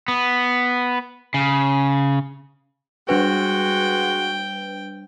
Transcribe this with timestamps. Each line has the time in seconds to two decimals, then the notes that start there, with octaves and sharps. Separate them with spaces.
0.08 B3
1.34 C#3
3.09 G3 G#3 D4 F#4 B4 G5